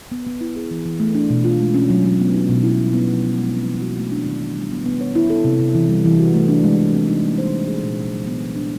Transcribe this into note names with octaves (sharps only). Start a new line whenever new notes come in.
B3
B3
E4
G#4
E3
E3
A3
D4
B2
F4
G#3
C#4
F#3
F#3
B3
D#4
B2
E4
G3
B3
F3
E4
G#3
C4
E3
F#4
A3
D4
D#3
D#3
G3
B3
B3
C#5
E4
A4
C3
C3
E3
G3
E3
F#4
A3
D4
G#3
G#3
C4
D#4
A#3
C5
D#4
G#4
A#2
A#2
F#3
B3
E3
D4